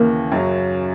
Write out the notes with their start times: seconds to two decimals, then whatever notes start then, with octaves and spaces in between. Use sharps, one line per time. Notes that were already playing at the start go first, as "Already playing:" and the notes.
Already playing: D#2 C#3 E3 A#3 A#4
0.32 F#2 C#3 F#3